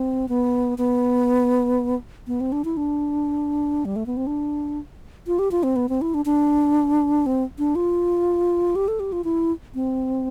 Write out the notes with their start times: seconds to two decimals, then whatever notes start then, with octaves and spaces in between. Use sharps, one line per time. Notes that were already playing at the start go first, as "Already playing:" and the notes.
Already playing: C4
0.29 B3
0.78 B3
2.27 B3
2.40 C4
2.52 D4
2.65 E4
2.77 D4
3.85 G3
3.96 A3
4.06 B3
4.17 C4
4.27 D4
5.27 F4
5.39 G4
5.51 F4
5.63 C4
5.76 B3
5.89 C4
6.01 E4
6.14 D4
6.25 D4
7.26 C4
7.59 D4
7.75 F4
8.76 G4
8.88 A4
9.00 G4
9.12 F4
9.24 E4
9.74 C4